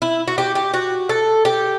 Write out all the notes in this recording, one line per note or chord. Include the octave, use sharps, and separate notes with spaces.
E4
F#4
G4
G4
F#4
A4
G4